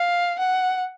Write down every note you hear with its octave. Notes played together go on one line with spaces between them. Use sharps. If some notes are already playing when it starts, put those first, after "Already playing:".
Already playing: F5
F#5